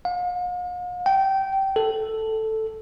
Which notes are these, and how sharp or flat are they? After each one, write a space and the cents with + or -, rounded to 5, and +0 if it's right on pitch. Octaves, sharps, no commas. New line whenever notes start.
F5 +45
G5 -20
A4 +0